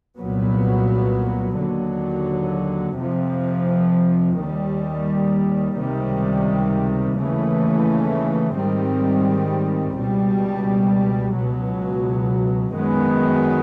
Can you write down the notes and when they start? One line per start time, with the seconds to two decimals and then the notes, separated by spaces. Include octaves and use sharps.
0.17 C2 A#2 F#3 B3
1.56 D#2 D3 F#3
2.97 F2 C3 F3
4.36 D#2 D#3 G3
5.75 C#2 C3 D#3 G3
7.16 D#2 C#3 E3 A3
8.55 G#2 D#3 G3 C4
9.95 C#2 B2 G3
11.34 C#2 B2 F#3
12.74 F#2 D#3 G#3 B3